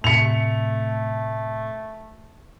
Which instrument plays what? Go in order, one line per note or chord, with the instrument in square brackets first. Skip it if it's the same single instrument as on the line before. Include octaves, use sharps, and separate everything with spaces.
[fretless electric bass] A2 C3 [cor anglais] A3 [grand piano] C#7 F7